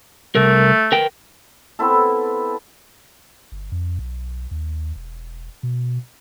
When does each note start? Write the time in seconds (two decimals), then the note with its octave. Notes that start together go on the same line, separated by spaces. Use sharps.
0.35 C2 A3 A#4
0.92 A#4 B4 G5
1.79 B3 C4 E4 A4
3.52 G1
3.72 F2
3.99 B1
4.51 D#2
4.96 E1
5.63 B2